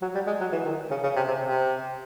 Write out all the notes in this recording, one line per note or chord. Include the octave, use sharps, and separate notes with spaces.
F#3
G3
G#3
F#3
E3
D#3
C#3
C#3
C3
C3
C3